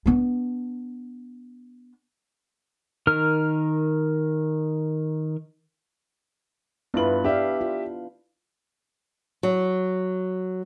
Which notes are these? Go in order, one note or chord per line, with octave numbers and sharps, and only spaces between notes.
B3 D4
D#3 A#4 F6
G2 B3 E4 F4 B4 F#7
D4 G4 E5 F5
F4
F#3